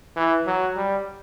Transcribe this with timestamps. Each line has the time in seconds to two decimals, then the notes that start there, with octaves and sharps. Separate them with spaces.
0.16 E3
0.46 F#3
0.76 G3